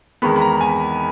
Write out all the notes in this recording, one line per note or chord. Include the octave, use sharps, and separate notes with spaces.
E2 D#3 G#3 B3 B5
B5
A#5
G#5